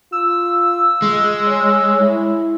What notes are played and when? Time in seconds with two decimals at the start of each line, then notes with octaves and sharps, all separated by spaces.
0.12 F4 E6
1.02 G#3
1.48 C#5
2.00 E4